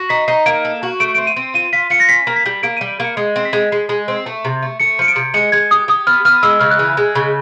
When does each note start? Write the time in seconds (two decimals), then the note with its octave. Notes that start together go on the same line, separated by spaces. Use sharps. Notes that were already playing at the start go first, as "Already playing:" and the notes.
Already playing: F#4 A#6
0.09 D#4 B6
0.28 D#4 C7
0.46 A#3 D7
0.65 A4
0.83 F#4
1.00 A3 D7
1.14 C4 D7
1.27 D#7
1.36 C4
1.54 F4 D#7
1.73 F4 B6
1.90 F4 C#7
2.00 A#6
2.09 C#4 B6
2.27 A#3
2.36 B6
2.46 G3
2.63 A#3 D7
2.77 G3 D#7
2.90 D7
3.00 A#3 C#7
3.17 G#3 C7
3.36 C4
3.45 B6
3.53 G#3
3.72 G#3 C7
3.89 G#3
4.08 C4
4.26 A3
4.45 C3
4.63 A3
4.80 A3 C#7
4.99 F3 C#7
5.08 D7
5.16 C3
5.34 G#3 C#7
5.52 G#3 G#6
5.71 G4 D#6
5.88 G4 D#6
6.07 B3 F6
6.25 B3 F6
6.43 G#3 E6
6.60 C#3 F6
6.71 F#6
6.79 E3
6.97 G#3
7.15 C#3